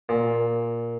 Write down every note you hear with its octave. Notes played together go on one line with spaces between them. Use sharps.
A#2